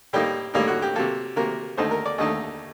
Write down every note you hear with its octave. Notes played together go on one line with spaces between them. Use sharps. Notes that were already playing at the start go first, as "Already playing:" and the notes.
A2 G3 A#3 D#4 G4
A2 G3 A#3 D#4
F#4
G4
C3 F#3 A#3 A4
C3 F#3 A#3 A#4
D#2 D3 A3 D#4 C5
A#4
D5
D#2 D3 A3 D#4 D#5